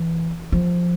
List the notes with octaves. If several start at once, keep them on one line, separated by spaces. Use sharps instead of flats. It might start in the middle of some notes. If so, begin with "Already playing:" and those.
Already playing: E3
F3